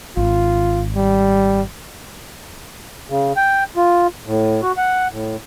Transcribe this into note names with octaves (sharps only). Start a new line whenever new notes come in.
G#1 F4
G3
C#3
G5
F4
A2
F#4
F#5
A2